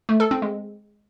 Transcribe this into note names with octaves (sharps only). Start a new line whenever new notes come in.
A3
A4
C4
G#3